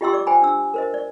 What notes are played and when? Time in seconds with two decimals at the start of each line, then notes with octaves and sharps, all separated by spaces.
0.01 F4 G4 D#5 G5 C6 E6
0.13 D5 D6
0.27 C5 G5 G#5 B5
0.42 D4 E6
0.74 A#4 C5 D#5
0.94 D5